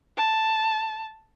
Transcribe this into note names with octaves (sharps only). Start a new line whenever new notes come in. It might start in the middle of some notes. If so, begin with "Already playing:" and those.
A5